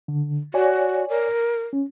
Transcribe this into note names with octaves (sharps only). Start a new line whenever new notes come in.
D3
F#4 C#5 D5 G#5
A#4
C#4